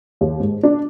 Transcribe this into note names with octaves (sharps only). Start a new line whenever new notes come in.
D#2
G#2
D4